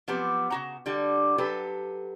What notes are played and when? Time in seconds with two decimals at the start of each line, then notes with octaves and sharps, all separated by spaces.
0.08 F3 F#3 B3 C4 G4
0.50 C#3 F#4 A#5
0.86 D3 G3 F#4
1.38 F#3 G4 A4 B4